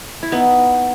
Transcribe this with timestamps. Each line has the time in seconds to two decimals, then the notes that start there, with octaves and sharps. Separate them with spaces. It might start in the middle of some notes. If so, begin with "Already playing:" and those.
0.23 E4
0.32 B3 D#4